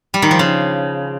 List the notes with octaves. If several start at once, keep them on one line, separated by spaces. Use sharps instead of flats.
G3
D#3
F3
C#3